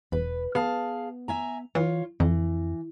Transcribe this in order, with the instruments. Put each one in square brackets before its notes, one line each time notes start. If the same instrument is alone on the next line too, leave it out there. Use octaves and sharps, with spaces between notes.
[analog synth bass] E1 [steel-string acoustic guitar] B4
[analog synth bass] B3 [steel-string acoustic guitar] G#4 F5 A5
[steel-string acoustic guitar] E5 G#5 A#5
[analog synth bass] E3 [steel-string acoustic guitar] F4 C#5
[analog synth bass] F2 [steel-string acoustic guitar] E3